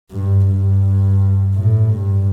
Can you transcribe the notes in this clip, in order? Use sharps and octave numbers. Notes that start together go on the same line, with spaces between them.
G2
G2
A2
G2